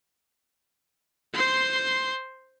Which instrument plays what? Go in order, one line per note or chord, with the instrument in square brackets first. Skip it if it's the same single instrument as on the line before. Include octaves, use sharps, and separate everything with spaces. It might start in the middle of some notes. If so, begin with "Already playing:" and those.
[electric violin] C5 C6